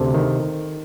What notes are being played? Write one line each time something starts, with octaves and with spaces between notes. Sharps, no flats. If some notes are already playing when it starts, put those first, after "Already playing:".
Already playing: D2 C3 A4
D#3